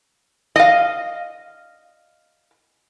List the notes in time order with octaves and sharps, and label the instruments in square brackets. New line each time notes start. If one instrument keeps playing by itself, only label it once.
[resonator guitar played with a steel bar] D#5 F5